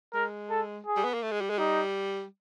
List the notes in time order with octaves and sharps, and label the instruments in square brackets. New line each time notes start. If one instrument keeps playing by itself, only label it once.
[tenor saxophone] G#3 [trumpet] A#4
[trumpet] A4
G#4
[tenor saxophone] G3
B3
A#3
A3
G#3
G3
G#3
[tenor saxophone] G3 [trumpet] D#4